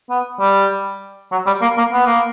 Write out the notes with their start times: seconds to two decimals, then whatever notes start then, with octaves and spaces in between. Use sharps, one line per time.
0.10 B3
0.40 G3
1.32 F#3
1.47 G3
1.62 A#3
1.78 A#3
1.93 B3
2.06 A#3